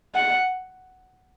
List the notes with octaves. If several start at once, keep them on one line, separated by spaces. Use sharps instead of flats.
F#5